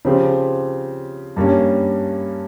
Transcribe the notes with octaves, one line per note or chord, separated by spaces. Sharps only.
C#3 F3 C4 G4
G2 G3 A#3 C#4